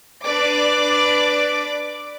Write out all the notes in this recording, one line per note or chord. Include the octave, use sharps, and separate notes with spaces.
D4 B4 D5 D6